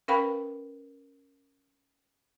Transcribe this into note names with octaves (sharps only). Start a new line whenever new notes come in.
C#4 A#4 B4 F5 G5 B5